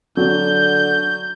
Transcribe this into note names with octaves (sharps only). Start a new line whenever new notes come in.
D3 F#3 G6